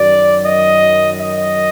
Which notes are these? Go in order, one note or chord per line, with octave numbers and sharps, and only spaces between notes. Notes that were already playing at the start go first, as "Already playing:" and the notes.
Already playing: F#2 D#3 F#3 D5
D#5
D#5